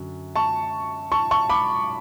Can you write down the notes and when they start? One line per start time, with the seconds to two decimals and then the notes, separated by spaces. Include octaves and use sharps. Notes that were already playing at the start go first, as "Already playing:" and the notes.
Already playing: F#2 D3
0.36 A5 C#6
1.12 A5 C#6
1.31 A5 C#6
1.49 B5 D6